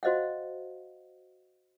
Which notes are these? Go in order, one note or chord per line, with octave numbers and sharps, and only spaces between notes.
F#4 C5 D#5 F5 F#5